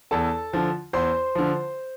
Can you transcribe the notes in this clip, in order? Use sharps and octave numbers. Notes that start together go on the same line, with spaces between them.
E2 A4 A5
D3 F3
E2 C5 C6
D3 F3